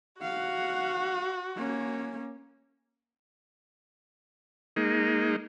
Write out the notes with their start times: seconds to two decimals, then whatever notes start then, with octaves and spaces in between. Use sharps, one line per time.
0.22 F#4 F5 F#5
1.56 A#3 C#4
4.76 G#3 A#3 D#4